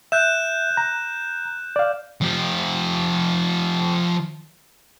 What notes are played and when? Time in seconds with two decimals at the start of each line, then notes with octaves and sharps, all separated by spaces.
0.12 E5 F#6 G6 E7
0.77 A#5
1.76 D5 F5
2.21 F3 G4